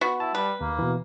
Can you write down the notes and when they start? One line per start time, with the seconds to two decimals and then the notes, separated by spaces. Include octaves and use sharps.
0.01 B3 F#4
0.20 E4 A5
0.35 G3 B4
0.61 D#2 A#3
0.79 B2 E3